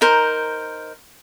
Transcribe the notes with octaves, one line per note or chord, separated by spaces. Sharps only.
D#4 A#4 C5